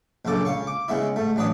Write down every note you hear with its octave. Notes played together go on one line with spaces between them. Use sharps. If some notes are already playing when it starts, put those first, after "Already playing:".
A#1 F#2 C#3 A4 D6
C#2 F5 C#6
D6
C#3 G#3 B3 E4
G#2 A3
A1 F#3 D4 B4 D#6